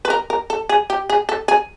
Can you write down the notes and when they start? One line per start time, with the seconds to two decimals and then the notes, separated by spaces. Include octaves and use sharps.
0.05 B4
0.10 A#4
0.30 A#4
0.50 A4
0.69 G#4
0.90 G4
1.10 G#4
1.29 A4
1.48 G#4